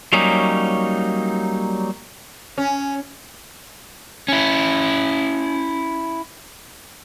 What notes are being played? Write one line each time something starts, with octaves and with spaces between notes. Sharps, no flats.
F#3 G3 A#3 C#4 D#4
C#4
C#4 E4